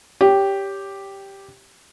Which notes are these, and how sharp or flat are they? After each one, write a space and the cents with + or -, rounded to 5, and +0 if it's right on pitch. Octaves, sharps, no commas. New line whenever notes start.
G4 +0 C#5 +20